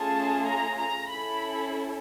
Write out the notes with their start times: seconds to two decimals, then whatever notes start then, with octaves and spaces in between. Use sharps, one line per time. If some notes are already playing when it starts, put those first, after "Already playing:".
Already playing: A3 C#4 F4 G#4 A5
0.47 A#5
0.80 A#5
1.11 C#4 E4 A4 B5